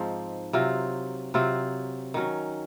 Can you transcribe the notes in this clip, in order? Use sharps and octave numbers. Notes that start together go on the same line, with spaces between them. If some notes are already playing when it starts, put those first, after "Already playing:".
Already playing: G#2 F3 C4 D#4
C3 F#3 C4 F4
C3 F#3 C4 F4
D#3 F#3 C#4